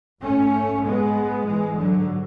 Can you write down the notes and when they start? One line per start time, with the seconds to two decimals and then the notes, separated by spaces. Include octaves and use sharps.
0.22 G#2 A3 C#4
0.84 G#3 B3
1.45 G#2 E3 G#3
1.76 D3 F#3